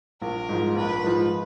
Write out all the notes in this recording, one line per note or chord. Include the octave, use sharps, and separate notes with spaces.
A#1 A#4
G#2 F3
A#1 B4
G#2 F3